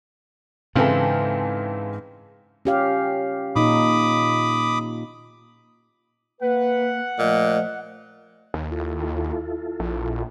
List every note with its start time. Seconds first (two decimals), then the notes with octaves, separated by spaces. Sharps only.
0.76 G#2 C#3 E3 C4 A4 B4 F5
2.65 C#4 G4 F5
3.56 A#2 D#4 B5 D6 D#6
6.41 A#3 B4 F#5
7.19 A#2 F3 A3 D#5
8.54 D#2
8.71 E4 F4 A4
9.80 A#1